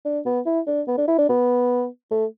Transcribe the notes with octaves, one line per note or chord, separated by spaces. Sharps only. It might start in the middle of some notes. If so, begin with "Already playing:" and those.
D4
B3
E4
D4
B3
D4
E4
D4
B3
A3